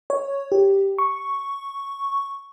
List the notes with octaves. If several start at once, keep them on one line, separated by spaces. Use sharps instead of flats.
C#5
G4
C#6